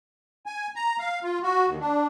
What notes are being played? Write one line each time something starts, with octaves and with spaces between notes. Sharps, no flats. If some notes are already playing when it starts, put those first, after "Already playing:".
G#5
A#5
F5
F4
F#4
D#2
D4